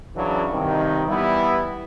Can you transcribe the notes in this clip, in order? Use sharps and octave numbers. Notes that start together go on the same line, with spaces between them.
C#3 E3 F#3 D4
G2 C3 D#3
E3 G3 B3 E4